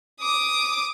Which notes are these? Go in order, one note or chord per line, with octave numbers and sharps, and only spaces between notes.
D6 D#6